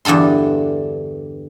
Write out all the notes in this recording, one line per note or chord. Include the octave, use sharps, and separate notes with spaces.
E2 G2 D3 A4 C6